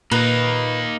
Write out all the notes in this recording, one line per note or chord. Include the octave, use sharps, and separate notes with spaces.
A#2 A#3 D#4 B4